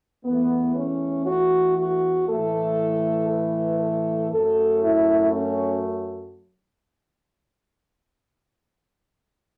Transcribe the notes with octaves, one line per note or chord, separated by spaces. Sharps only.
E2 E3 A3 B3
C#4
F#4
F#4
A2 E3 A3 A4
B4
A4
F#2 F#3 A3 A4
E4
C#4